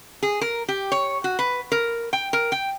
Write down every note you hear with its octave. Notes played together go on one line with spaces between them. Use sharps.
G#4
A#4
G4
C#5
F#4
B4
A#4
G5
A#4
G5